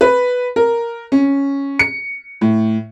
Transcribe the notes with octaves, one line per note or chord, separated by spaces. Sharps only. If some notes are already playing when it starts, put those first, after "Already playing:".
B4
A#4
C#4
C#7
A2